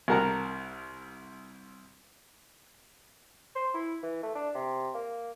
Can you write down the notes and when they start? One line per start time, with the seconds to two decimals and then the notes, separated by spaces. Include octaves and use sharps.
0.08 C2 F#4 A#4 F#5 A5 A#5
3.55 C5
3.74 E4
4.03 E3
4.23 A3
4.35 D4
4.55 C3
4.95 A#3